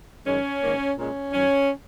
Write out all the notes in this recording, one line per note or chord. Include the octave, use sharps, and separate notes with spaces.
F#2 D#3 G#3 C#4
G#2 D#3 A#3
A#2 G#3 C#4
F#2 D#3 F#3 C#4